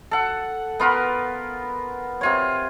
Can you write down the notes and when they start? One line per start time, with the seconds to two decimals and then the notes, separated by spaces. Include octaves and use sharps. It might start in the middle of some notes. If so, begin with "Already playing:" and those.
0.11 A4 F#5
0.80 B3 F4 A#4 B4
2.21 C3 F4 C#5